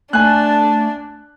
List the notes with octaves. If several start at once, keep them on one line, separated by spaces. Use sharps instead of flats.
A3 D4 G#5 A5 F#6